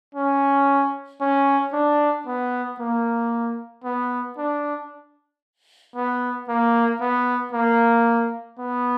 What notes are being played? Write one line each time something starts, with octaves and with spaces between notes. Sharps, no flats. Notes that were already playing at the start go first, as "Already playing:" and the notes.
C#4
C#4
D4
B3
A#3
B3
D4
B3
A#3
B3
A#3
B3